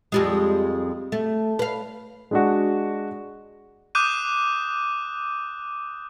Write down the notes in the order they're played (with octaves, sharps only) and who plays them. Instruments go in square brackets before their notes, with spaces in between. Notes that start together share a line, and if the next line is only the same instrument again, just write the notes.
[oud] F2 G3 G#3
A3
B4 F5
[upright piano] G#3 D4 F#4
[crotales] D6 D#6 F#6 G6 D#7